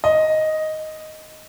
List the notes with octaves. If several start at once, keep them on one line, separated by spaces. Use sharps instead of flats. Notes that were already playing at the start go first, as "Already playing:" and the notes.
D#5